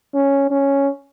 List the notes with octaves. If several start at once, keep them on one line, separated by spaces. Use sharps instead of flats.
C#4
C#4